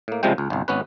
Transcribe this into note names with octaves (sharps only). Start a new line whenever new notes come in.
A2 A#3
C#2 C3 F3 G3 G#3 G5
C#2
G1 C2
G#1 B3 C#4 B4